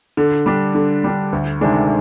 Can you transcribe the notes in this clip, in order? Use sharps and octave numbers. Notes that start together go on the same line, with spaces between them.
D3
G3 D4
D3
G3 D4
D2
C3 D#3 G#3 D4